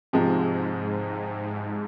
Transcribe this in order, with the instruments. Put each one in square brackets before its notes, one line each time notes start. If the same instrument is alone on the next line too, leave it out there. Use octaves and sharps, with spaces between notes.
[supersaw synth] G#2 [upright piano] C3 F3 G#3
[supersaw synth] G#2